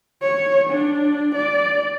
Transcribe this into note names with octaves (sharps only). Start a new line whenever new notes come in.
C#5
D4
D5